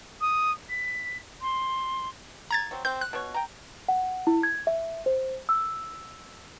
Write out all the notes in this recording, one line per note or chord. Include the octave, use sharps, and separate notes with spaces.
D#6
B6
C6
A#5 G#6 A6
F#3 C4
C4 G6
F#6
B2 C#5
G5 A#5
F#5
E4
G#6
E5
C5
E6